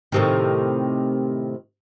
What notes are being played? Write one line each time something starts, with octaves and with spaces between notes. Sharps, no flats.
A2 C3 D#3